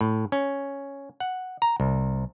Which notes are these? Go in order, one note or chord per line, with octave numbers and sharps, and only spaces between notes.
A2
C#4
F#5
A#5
C2